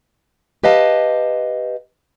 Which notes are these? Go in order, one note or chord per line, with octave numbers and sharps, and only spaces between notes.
G4 B4 D#5 F5 A5